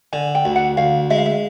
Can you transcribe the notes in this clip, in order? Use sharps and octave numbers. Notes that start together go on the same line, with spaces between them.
D3 G#5
G5
D2
F#5
D2 F5
G#3 E5
F5
E5